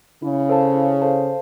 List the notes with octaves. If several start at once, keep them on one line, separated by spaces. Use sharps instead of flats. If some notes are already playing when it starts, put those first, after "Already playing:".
C#3 E4
A4 C5 F5 A5
E4
A4 C5 F5 A5